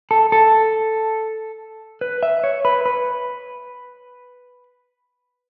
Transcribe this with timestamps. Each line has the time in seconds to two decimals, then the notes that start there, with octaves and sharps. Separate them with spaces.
0.11 A4
0.32 A4
2.01 B4
2.23 E5
2.44 C#5
2.65 B4
2.86 B4